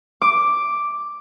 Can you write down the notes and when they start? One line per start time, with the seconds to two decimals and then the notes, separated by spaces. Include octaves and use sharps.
0.21 D6